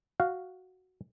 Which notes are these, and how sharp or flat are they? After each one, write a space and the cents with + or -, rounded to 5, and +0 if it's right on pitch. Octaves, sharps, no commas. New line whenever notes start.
F#4 +0 F5 +0